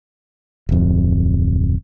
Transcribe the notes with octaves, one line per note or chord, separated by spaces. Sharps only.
D1 F2